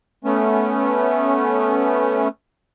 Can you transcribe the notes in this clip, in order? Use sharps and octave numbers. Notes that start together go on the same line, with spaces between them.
A3 B3 C#4